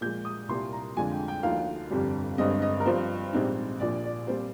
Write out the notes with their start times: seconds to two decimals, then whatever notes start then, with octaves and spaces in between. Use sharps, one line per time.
0.01 A#2 F3 G#3 G6
0.25 D#6
0.48 C2 A#2 G3 A#3 C6
0.72 A#5
0.96 F2 D3 G#3 D4 F4 G#5
1.12 G5
1.28 G5
1.43 D2 D3 F3 A#3 D#4 F5
1.90 G1 F2 C3 G3
2.38 G1 G2 D3 G#3 C4 D#5
2.62 D#5
2.80 A#4
2.86 G2 F3 C4 F4 C5
3.33 A#1 G#2 G3 C4 D#4
3.80 A#1 A#2 F3 D5
4.04 D5
4.27 A#2 G3 C4 F4 C5